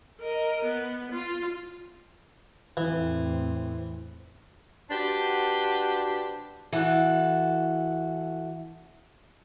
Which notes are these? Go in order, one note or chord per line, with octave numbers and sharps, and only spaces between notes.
A#4 D#5
B3
F4
E2 A2 E3 C4
D4 F#4 G4 B4 C5
E3 F#4 A4